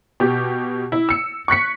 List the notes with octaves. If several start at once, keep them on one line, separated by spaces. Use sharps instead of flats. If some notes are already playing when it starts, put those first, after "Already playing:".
B2 G4
E4
E6 C#7
C#6 F#6 B6 C#7